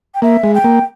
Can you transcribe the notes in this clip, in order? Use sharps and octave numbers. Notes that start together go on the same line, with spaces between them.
G5
A#3 E5
G#3
G5
A#3